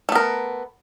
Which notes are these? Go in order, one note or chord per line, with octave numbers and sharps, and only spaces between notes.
A3 B3 A#4